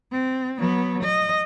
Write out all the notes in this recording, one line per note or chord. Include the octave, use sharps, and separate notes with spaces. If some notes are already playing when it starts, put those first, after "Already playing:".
C4
F#3 B3
D#5